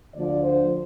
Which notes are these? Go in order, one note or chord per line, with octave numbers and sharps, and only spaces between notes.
D2 D3 F3 D5
C5